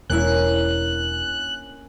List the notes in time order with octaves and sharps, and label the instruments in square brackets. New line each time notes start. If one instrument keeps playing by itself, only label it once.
[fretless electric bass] E1 [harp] A#3 D4 E4 [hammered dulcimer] C#4 [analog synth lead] F#6